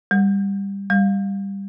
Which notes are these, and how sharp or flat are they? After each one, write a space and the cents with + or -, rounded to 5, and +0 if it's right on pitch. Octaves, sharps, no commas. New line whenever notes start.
G3 +15
G3 +10